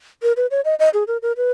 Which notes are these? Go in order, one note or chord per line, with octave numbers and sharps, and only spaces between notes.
A#4
B4
C#5
D#5
D#5
G#4
A#4
A#4
B4